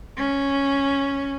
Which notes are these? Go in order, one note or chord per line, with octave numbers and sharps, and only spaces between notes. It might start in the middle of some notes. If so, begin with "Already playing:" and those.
C#4